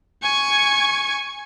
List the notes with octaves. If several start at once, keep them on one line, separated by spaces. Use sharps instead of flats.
G#5 C#6